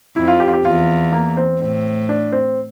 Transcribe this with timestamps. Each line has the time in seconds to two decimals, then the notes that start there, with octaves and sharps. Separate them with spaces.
0.16 F2 E4
0.28 F4
0.40 G4
0.48 F4
0.53 G4
0.65 E2 F4
1.12 A#3
1.37 C4
1.60 A2 C4
2.09 D4
2.32 C4